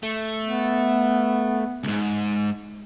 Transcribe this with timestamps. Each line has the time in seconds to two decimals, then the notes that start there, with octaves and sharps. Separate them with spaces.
0.03 A3
0.43 B3
1.84 C#2 G#2